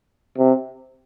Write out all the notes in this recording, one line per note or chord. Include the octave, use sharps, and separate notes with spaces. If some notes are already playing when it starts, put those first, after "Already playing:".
C3